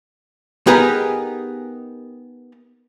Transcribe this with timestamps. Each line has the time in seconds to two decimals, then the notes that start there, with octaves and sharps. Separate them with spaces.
0.67 B3 D#4 G4 G#4 A#4 B4